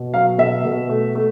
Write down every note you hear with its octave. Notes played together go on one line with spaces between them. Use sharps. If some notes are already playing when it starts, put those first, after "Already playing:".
Already playing: B2
F#3 F5
B2 E5
B2
A3
A3